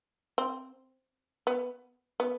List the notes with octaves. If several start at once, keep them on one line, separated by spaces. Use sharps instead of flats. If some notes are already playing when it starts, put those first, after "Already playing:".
C4
B3
B3